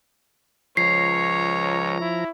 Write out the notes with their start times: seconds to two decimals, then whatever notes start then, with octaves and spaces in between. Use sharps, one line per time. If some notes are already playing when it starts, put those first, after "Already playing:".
0.77 C#2 F3 C#5 A#5 C7
2.01 E4